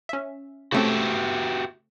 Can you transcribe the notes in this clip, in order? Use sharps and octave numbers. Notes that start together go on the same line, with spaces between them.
C#4 E5
C#3 A3 C4 F#4 G4 E5